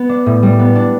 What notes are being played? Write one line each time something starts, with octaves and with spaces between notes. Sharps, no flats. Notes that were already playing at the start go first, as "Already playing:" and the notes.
Already playing: B3
D4
A2
G3
B3
D4